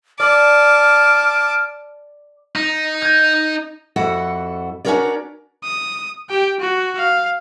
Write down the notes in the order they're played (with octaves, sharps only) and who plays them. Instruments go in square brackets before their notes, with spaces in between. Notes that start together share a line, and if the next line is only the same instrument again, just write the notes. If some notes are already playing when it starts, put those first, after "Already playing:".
[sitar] D5 [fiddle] A5 D6 [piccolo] F6
[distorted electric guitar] D#4
[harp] G6 G#6
[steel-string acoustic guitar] F2 E4 F#4 A4 F#5
C#4 D4 F#4 A#4 C#5 D5
[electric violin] D#6
G4 G5
F#4
F5